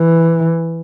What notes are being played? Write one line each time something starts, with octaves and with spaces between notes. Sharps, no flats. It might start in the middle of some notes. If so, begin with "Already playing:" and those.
Already playing: E3